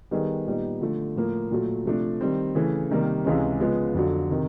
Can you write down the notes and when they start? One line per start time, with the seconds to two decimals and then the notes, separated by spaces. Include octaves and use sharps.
0.11 D#3 G3 B3 D#4 G#4
0.47 A#2 G3 B3 D#4
0.81 D3 F3 A3
1.16 A2 F3 A#3
1.51 A#2 F#3 A3
1.85 C3 F3 A3 D4
2.21 D#3 G3 C4
2.55 C#3 E3 A3
2.91 C3 D#3 G3 A#3
3.25 C#2 C3 E3 G#3 C#4
3.60 C#3 F3 G#3 B3
3.94 F2 D3 F#3
4.30 C3 D#3